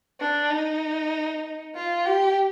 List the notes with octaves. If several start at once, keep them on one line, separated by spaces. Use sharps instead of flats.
D4
D#4
F4
G4